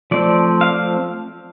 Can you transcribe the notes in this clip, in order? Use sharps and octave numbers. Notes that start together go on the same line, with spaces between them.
F3 A3 C4 D5
F5